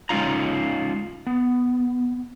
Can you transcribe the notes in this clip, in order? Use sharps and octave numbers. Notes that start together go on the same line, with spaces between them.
G#3 C#4 D#4 F4 A#5
B3